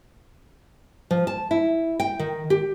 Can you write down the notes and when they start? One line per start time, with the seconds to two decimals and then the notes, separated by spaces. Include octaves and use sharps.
1.11 F3
1.27 A5
1.51 E4
2.00 G5
2.19 D#3
2.50 G4